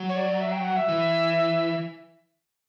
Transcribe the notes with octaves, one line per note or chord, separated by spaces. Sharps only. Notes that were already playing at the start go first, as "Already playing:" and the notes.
Already playing: F#3
C#5
D5
E5
G5
F#5
E5
E3